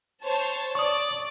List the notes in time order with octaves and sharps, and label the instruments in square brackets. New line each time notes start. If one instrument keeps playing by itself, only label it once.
[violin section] C5 C#5 A5
[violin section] D5 [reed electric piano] C#6 D#6